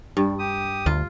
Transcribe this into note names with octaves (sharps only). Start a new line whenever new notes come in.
G2 G3
G4 D#6
D2 F4